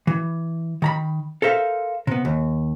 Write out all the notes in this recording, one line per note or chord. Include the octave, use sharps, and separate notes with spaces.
E3
D#3 A#5 B5
A4 A#4 C5 E5 F5
C3 B3
D#2